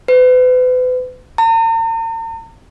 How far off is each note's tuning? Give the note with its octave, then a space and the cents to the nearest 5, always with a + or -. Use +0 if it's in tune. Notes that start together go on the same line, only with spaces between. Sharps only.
B4 +40
A#5 -45